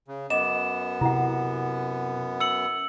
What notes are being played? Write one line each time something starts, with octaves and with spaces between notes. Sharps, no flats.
C#3
F#2 B3 D#5 D6 E7
C3 E4 F#5
E6 C#7 F#7